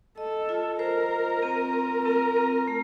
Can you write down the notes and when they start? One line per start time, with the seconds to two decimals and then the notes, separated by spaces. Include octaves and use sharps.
0.18 A4 D#5
0.49 F4
0.79 A#4 C5
1.11 F4
1.43 C4
1.73 C4
2.05 C4 A#4
2.36 C4
2.68 A3